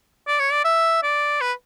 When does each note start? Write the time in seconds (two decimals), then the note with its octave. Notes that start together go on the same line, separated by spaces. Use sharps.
0.27 D5
0.39 C#5
0.52 D5
0.65 E5
1.03 D5
1.41 B4